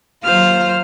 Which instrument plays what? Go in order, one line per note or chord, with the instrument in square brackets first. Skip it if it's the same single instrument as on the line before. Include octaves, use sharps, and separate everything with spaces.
[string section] D#2 F#3 [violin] F4 [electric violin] C5 F6